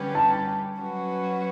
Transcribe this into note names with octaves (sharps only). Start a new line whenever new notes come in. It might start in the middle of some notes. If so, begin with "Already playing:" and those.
Already playing: D3 G3 C#4 G4 B4
A5
F#3 C#4 F#4 B4